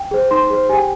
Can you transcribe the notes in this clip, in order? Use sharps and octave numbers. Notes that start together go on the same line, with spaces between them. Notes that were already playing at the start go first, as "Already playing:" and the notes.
Already playing: G5
G#4 C5
D#4 C6
G#4 C5
G4 G#5
G5